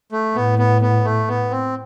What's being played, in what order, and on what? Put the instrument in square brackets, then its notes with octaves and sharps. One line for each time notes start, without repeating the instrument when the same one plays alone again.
[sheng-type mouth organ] A3
[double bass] A2 [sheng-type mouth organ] B3
[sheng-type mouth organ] B3
B3
A3
B3
C4